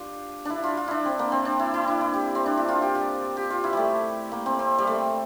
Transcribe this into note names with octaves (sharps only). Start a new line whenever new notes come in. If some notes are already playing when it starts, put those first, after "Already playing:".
Already playing: D4 F4 G4
D4 E4
F4
F4
D4 E4
C4
A#3
C4
D4
E4
E4
D4
E4
G4
C4
D4
E4
F4
G4
F4
G4
F4
E4
G3 A3
A#3
C4
C4
G3
A3